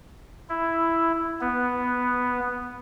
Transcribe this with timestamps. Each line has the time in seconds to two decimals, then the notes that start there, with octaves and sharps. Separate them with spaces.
0.49 E4
1.41 B3